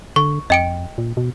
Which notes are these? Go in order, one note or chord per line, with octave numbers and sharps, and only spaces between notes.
D3 C#6
F2 D#5 G5 D7
A#2
B2